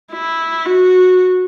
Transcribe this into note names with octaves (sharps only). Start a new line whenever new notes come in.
E4
F#4